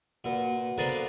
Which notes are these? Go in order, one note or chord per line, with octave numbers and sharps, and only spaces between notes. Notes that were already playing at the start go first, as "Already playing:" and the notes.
A#2 F#4 B4 F#5
D3 A#3 B3 C5 A6 C7